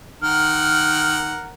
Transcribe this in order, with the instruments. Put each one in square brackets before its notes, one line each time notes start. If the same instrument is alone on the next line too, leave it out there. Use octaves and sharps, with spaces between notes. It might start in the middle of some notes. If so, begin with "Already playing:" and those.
[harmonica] D#3 A#4 F#5 [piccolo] F6